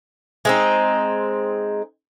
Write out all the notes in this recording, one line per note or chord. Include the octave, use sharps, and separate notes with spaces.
G#3 C4 D#4